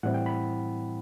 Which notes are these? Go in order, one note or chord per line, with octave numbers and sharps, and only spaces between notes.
A2 E3 G3 C4 E4 F#5
G5
B5